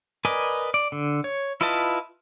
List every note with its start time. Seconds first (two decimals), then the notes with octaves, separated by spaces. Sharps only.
0.25 A#4 B4 D5 D#5 G#5
0.74 D5
0.92 D3
1.24 C#5
1.61 E4 F4 B4 D#5 A5